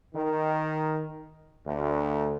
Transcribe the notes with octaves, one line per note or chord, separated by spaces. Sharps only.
D#3
D2